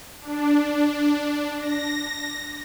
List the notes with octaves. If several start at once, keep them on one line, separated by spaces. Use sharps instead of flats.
D4
A#6